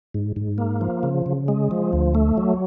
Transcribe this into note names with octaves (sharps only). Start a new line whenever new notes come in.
G#2
G#2
A#3
F3
C#3
C#3
G#3
F3
D2
A3
F#3